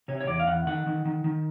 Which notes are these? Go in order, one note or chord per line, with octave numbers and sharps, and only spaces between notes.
C3 C#5
C#5
E2 D5
F5
E2 F#5
D#3 F#5
D#3
D#3
D#3